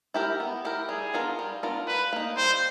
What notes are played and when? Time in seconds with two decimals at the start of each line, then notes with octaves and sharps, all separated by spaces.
0.14 E4 G4 A#4
0.40 B3
0.65 E4 G4 A#4
0.89 G3 G#4
1.13 B3 D4 F4 A#4
1.39 G3
1.63 B3 D4 F4 A#4
1.87 G3 B4
2.13 A#3 D#4
2.37 G3 C5